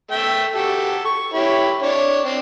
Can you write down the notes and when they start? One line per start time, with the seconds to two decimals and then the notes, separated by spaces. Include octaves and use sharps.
0.11 A3 E5 G5
0.55 F#4 G4 A4
1.05 C#6
1.34 E4 G4 C#5
1.83 D4 C#5
2.25 C4 D4